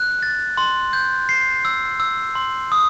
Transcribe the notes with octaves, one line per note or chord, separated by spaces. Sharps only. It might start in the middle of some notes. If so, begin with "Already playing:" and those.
Already playing: F#6
A6
C6
G6
C7
E6
E6
C6
D#6